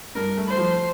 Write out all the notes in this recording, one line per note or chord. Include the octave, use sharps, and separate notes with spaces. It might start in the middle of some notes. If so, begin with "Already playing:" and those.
G2 A#4
A3
C5
F3